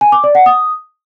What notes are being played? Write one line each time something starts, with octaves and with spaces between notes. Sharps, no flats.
G#5
D6
D5
F#5
D#6